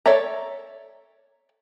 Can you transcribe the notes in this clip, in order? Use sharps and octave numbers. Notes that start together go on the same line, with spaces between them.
A4 C#5 D5 E5 A#5